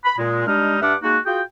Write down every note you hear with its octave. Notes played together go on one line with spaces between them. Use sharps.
B5
A#2 G#3
G3 G#3 D4 D#4 F6
G2 D4 E5 F#5 D6 F6
G#3 A#3 D#4 F#4
F4 F#4 G#4 G5